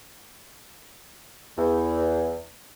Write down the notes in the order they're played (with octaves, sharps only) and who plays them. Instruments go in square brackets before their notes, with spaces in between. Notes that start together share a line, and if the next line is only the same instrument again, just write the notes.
[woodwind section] E2